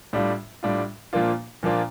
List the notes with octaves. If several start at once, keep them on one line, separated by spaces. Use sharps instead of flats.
A2 G3 D4 F4
A2 G3 D4 F4
A#2 F3 A#3 D4 F4
A#2 F3 A#3 D4 F4